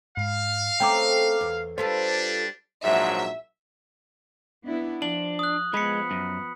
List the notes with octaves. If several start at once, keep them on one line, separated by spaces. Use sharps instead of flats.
G#2 F5
A3 C4 C#4 G5 A#5 D6
E2
G3 D4 F4 A4 B4 C5
A#1 G#2 F#3 E5
B3 D4 E4
F3 D4 F#7
D#6 F#6
F3 G#3 B3 B5 B6 C#7
F#2